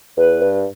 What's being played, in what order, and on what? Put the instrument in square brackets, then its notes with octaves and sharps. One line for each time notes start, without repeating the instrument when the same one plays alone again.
[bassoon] E2 [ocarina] B4
[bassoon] G2